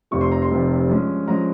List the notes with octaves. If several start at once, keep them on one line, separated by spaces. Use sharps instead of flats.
F1 F2 C3 G3 C#6
C6
A#5
C6
F1 F2 C3 G3
G2 F3 G#3 C#4
G2 F3 G#3 C#4 A#5